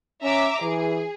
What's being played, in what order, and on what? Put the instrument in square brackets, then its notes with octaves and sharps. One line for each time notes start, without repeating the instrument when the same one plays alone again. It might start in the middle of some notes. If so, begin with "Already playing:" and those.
[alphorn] C#4 [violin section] E5 A#5 D6
[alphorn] E3 [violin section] G#4